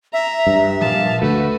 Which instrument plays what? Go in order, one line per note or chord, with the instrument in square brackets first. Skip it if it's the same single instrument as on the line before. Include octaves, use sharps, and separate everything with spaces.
[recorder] E5 [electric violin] A#5
[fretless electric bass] G2
[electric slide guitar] A#2 F3 [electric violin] F5 A5
[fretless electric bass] D2 [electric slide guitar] A3 [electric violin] F#4 B4